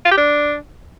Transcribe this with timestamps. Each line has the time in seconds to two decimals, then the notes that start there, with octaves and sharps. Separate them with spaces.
0.05 F4
0.11 G4
0.17 D4